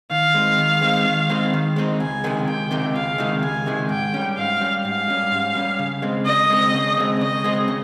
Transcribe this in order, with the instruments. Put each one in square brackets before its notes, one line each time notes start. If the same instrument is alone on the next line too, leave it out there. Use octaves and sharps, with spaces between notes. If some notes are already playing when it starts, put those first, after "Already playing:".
[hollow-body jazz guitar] D#3 [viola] F5
[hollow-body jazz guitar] G#3 C4 D#4
D#3
G#3 C4 D#4
D#3
G#3 C4 D#4
D#3
G#3 C4 D#4
[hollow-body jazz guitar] C#2 [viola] G#5
[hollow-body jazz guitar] C3 D#3 G#3
[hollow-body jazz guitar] C#2 [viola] G5
[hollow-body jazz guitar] C3 D#3 G#3
[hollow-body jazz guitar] C#2 [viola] F5
[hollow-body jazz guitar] C3 D#3 G#3
[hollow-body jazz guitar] C#2 [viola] G#5
[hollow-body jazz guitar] C3 D#3 G#3
[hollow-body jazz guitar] G#2 [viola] G5
[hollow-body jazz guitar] G3 C#4
[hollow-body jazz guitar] G#2 [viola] F5
[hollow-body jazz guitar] G3 C#4
[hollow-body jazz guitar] G#2 [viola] F5
[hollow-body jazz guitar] G3 C#4
G#2
G3 C#4
C#3
G#3 C4
[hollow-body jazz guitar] C#3 [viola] D#5
[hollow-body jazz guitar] G#3 C4
C#3
G#3 C4
[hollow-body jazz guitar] C#3 [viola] D#5
[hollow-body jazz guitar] G#3 C4
C#3